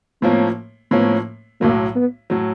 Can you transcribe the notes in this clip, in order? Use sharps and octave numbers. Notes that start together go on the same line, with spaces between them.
A2 F3 A#3 B3 C#4
A2 F3 A#3 B3 C#4
B1 A2 F#3 A#3
B3
A2 F#3